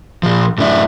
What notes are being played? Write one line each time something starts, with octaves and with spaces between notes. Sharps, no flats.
A#2 F3
F#2 A2 D4 E4